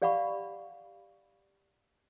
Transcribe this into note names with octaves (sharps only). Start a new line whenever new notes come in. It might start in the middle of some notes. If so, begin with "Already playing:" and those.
G4 D5 F5 F#5 B5 C#6